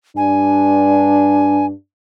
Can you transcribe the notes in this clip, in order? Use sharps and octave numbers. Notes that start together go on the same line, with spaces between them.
G2 D4 G#5